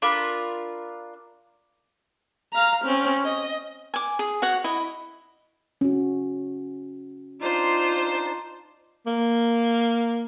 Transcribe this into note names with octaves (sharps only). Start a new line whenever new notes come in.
D4 F4 A#4 B5
F5 A#5
C4 C#4
D#5
G#5 D6
G#4
F#4 C#5 F#5
E4 D#5
C#4 F#4
D4 D#4 F4 C5
A#3